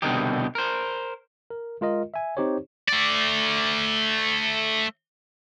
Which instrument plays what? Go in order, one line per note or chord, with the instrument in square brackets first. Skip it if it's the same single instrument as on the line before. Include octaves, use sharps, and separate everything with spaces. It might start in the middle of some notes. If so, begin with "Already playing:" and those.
[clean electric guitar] C2 B2 D3 D#3 D#4 G4
A#4 C5
[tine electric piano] A#4
G#3 F4 A#4 D#5
E5 G#5
C4 D#4 G4 C5 C#5
[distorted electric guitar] A3 D5